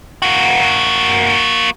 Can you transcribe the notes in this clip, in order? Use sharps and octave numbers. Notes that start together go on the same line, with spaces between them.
A#3 F#4